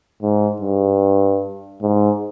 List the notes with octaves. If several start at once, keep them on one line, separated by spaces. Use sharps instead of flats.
G#2
G2
G#2